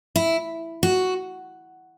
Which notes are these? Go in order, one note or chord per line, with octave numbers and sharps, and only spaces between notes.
E4
F#4